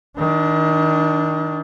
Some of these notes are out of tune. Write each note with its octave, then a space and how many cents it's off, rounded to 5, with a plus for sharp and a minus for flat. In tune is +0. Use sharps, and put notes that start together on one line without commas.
D#3 +30 D4 +0